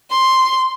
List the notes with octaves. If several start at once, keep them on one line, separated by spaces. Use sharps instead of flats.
C6